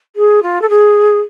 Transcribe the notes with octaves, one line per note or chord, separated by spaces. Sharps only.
G#4
F4
A4
G#4